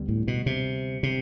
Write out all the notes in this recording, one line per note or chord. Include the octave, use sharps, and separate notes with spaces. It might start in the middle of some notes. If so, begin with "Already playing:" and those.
Already playing: D2 D3 G3 B3
A2
B2
C3
C3